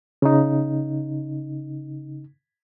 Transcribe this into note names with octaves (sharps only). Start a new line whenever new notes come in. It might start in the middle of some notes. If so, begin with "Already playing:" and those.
C#3 D#4